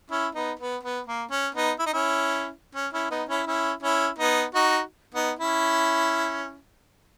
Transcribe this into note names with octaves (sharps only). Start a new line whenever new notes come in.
C#4 E4
B3 D#4
B3
B3
A#3
C#4
B3 D#4
E4
D#4
C#4 E4
C#4
C#4 E4
B3 D#4
C#4 E4
C#4 E4
C#4 E4
B3 D#4
D#4 F#4
B3 D#4
C#4 E4